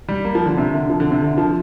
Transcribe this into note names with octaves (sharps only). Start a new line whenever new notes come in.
G3
A#3
F3
D3
C3
D3
F3
D3
C3
D3
F3